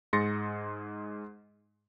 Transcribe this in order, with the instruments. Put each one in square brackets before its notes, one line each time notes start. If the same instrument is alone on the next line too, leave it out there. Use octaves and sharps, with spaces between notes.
[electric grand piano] G#2 G#4 C6 A6 A#6 C#7